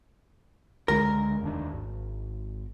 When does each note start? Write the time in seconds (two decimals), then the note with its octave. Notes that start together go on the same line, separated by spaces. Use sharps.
0.88 C#2 D3 G#3 A#4
1.41 F1 D#2 D4
1.71 G#1